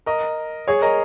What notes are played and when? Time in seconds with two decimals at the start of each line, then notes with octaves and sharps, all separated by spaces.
0.06 A#4 D#5
0.68 G#4 C#5
0.82 A#4 D#5